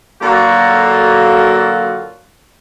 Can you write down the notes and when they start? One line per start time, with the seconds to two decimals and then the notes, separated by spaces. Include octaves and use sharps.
0.22 D3 F#3 A#3 F4 F#4 A4